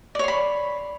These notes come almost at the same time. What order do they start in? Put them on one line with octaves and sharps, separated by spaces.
D5 C#5 C6 B5